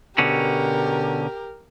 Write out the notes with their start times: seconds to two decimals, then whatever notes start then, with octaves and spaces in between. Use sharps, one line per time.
0.18 B2 D3 C#4 G4 A#4